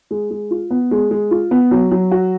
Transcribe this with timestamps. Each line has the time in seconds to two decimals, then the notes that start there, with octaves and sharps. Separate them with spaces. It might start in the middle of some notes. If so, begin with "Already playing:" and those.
0.11 G#3
0.30 G#3
0.51 F4
0.71 B3
0.91 G#3
1.11 G#3
1.31 F4
1.51 B3
1.71 F#3
1.91 F#3
2.11 F#4